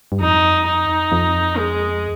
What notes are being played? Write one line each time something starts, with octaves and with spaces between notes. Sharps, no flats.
G2
F2 D#4
D#4
F2
G#3